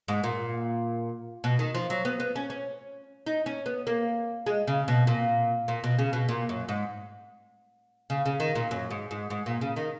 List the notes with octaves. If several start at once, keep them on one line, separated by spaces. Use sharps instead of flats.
G#2
A#2
B2
D#3
F3
F#3
B3
B3
C#4
C#4
D#4
C#4
B3
A#3
G#3
C#3
B2
A#2
A#2
B2
C#3
B2
A#2
F#2
G#2
C#3
C#3
D#3
A#2
F#2
G#2
G#2
G#2
A#2
C#3
D#3